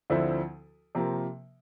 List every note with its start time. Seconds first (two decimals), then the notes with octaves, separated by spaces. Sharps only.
0.10 D2 D3 F3 C4 E4
0.95 C3 F3 A#3